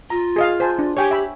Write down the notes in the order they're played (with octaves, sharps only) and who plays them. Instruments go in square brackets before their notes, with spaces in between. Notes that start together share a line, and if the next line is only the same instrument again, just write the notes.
[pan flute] F4 [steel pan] A#5
[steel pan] G#4 D#5 F5
C5 G#5 A5
D4
[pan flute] G4 [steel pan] C#5 G5 G#5
[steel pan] E5 B5